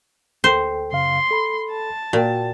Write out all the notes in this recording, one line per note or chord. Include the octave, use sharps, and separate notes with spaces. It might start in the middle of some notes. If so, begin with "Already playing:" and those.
D2 A4 C5 G5
F#2 C#3 F5 C6
A4 B5
A5
A#2 F#4 G5